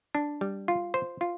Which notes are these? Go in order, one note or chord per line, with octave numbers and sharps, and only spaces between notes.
D4
G3
F4
C5
F4